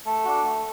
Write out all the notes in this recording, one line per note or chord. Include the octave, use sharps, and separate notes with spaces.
A3 A4
D4 F#4
A3